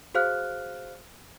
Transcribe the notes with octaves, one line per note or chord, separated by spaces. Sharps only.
F#4 G#4 C5 F5 F6 F#6